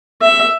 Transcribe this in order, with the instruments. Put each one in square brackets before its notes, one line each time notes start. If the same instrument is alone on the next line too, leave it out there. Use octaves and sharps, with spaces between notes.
[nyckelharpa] E5